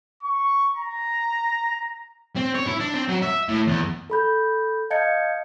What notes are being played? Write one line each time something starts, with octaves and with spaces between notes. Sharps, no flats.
C#6
A#5
C4
C#5
E4
D4
C4
F#3
E5
A2
E2
A4 B5 G6
D#5 F5 A5 G6 G#6 C#7